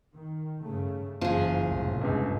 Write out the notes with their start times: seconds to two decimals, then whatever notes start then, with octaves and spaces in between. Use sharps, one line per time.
0.14 D#3
0.61 G2 C#3 A3
1.21 F#1 G#2 E3 F3 G#4
1.64 C2 F2 A2
2.01 G1 C#2